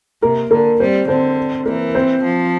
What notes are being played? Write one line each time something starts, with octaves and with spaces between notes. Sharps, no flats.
C3 A#3 A#4
D3 A#3 A#4
G3 C4 C5
D3 C4 C5
E3 A#3 A#4
C4 C5
F3